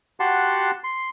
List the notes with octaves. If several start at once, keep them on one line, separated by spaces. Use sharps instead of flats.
F#4 G4 F#5 A5 C6
C6